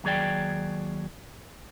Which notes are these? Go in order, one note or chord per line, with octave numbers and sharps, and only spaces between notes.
D#2 F#3 G#4 D5 G5